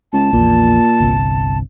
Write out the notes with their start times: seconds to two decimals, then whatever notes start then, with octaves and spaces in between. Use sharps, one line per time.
0.13 C#2 A5
0.33 A#1 E2 A#2
1.00 G1 C2 C3